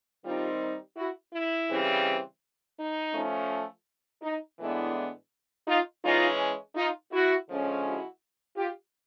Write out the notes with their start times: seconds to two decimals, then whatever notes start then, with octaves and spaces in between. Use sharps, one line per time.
0.24 D#3 G3 C4 D#4 F4 G4
0.97 E4 F#4
1.33 E4
1.69 C#3 E3 G3 C4
2.79 D#4
3.14 F3 A3 C#4
4.23 D#4
4.59 A2 E3 G#3 B3 D4 E4
5.67 D#4 F4
6.04 E3 G#3 C#4 D#4 F4
6.76 D#4 F4
7.12 E4 F#4
7.48 D3 F3 G#3 C#4
7.85 E4 F#4
8.57 F4 G4